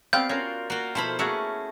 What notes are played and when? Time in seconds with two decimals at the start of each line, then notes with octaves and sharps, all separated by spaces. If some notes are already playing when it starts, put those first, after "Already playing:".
0.13 B3 C4 G4 D5 F5 G6
0.29 C#4 F4 F#4 A#4
0.70 A#3 F4 F#4
0.95 B2 F3 E4 F4 A4 C5 B5
1.19 A3 A#3 C#4 F#4 G#4 E5 F#5